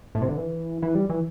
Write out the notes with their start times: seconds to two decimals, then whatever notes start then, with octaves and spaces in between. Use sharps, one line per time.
0.15 A2
0.22 C3
0.29 D3
0.37 E3
0.82 E3
0.95 G3
1.10 E3